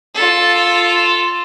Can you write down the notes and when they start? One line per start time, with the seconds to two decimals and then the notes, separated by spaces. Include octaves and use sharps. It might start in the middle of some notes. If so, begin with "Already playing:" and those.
0.15 F4 A4